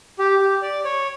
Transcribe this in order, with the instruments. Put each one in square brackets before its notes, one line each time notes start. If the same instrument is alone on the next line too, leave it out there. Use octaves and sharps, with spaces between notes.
[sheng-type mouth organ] G4
G4
D5
C#5